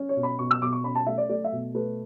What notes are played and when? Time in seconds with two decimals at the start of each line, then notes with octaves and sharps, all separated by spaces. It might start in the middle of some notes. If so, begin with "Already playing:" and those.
Already playing: C#4
0.09 C#5
0.16 B2
0.23 B5
0.39 B2 C#6
0.51 E6
0.62 B2 D6
0.72 C#6
0.84 C#4 B5
0.95 A5
1.07 A3 E5
1.18 D5
1.29 A3 D5
1.44 E5
1.52 B2
1.75 A3 B4